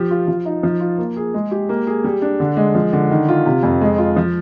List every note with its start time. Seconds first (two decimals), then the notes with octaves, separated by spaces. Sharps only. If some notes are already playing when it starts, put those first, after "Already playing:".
Already playing: F3 G4
0.11 F4
0.28 F3
0.46 D#4
0.63 F3
0.80 F4
0.98 A#3
1.17 G#4
1.34 G#3
1.51 G4
1.69 A#3
1.87 G#4
2.04 G3
2.22 D4
2.40 D3
2.57 G#3
2.75 F3
2.93 D3
3.11 D#3
3.28 F4
3.46 C3
3.63 F2
3.81 G#3
3.98 F4
4.16 F3